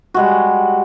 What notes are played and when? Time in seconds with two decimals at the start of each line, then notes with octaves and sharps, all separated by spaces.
0.14 G3 G#3 F#4